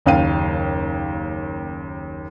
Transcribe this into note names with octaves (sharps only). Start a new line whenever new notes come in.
F#1 D#2 C#4 F5 G5 D#7